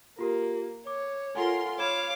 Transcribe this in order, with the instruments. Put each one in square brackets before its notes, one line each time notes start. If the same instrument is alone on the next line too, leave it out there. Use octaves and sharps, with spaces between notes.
[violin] A#3 [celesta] F4 G4 A#4
[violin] C#5 [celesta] D6
[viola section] F4 A#4 C6 [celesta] A4 F#5 G#5
[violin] C#5 D6 [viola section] F5 [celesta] B5 G#6 E7